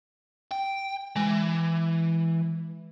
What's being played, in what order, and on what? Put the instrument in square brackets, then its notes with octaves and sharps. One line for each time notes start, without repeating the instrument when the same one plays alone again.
[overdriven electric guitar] G5
[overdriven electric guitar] E3 [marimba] G#3